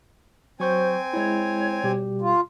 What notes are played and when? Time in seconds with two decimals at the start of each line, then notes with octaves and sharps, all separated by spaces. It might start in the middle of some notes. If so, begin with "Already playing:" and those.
0.60 F#3 C4 C5 G#5 C#6 G6
1.13 G#3 E4 C#5
1.83 B2 G3 G4
2.21 F4